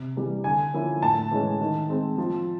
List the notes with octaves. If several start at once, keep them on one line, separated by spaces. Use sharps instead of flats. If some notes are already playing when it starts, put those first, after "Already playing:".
Already playing: C3
E3 G3
D3 G#5
F3 A#3 C#4 E4
A2 A5
E3 G#3 C#4
D#3
G#3 C4
F3